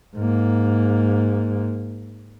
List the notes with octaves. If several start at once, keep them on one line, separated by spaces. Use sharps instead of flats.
G#2 A#3